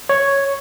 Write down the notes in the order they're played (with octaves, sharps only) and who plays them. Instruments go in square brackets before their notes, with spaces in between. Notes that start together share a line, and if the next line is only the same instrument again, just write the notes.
[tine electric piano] C#5